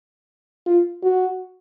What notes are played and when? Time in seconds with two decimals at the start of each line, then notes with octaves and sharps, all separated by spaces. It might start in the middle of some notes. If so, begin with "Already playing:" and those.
0.66 F4
1.03 F#4